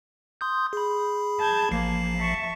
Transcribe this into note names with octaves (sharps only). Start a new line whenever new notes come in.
C6 D#6 G6
G#4 B5
A5 G6 G#6
A1 F3 A#3 C7
E5 A5 C#6